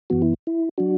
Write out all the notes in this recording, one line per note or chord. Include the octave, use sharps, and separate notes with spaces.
F#2 E3 B3 F#4
E4
E4
F#3 D4 F#4